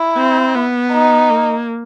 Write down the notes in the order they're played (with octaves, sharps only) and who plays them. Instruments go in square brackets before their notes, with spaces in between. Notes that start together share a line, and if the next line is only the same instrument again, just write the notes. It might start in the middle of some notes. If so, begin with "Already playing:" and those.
Already playing: [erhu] E4
[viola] C4
B3
[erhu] D#4
[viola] A#3